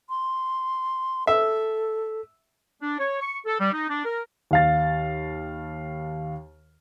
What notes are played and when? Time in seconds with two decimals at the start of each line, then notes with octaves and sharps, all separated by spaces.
0.09 C6
1.27 A4 E5
2.82 D4
2.98 C#5
3.20 C#6
3.46 A4
3.60 G3
3.73 D#4
3.89 D4
4.05 A#4
4.51 D#2 F5 A6